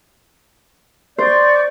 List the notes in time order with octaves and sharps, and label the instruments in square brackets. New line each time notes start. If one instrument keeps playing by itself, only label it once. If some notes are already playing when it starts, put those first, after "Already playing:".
[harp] C5 [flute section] D5 C#6 G6